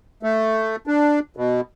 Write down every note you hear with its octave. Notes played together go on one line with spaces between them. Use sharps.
A3
D4
B2